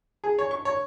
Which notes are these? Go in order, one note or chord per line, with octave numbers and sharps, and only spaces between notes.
G#4
C#5
C#6
C#5